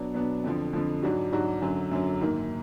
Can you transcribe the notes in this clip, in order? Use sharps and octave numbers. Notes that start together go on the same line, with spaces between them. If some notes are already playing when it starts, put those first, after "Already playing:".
Already playing: B2 F#3 B3 D4
B2 F#3 B3 D4
F2 D3 F3
F2 D3 F3
G#2 F#3 D4 F#4
G#2 F#3 D4 F#4
F#2 D3 F#3
F#2 D3 F#3
G#2 D#3 A#3